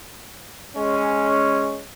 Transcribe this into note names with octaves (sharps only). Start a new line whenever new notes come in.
G#3 C#4